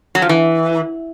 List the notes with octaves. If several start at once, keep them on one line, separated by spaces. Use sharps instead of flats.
F#3
F3
E3